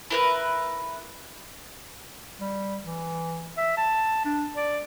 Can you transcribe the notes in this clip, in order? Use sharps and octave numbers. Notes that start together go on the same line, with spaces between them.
E4 A#4 B4
G3
E3
E5
A5
D4
D5